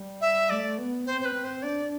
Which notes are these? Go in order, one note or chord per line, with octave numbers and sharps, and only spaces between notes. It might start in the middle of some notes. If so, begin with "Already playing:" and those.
Already playing: G3
E5
A3 D5
B3
C4 C5
C5
B4
C4
C5
D4 D5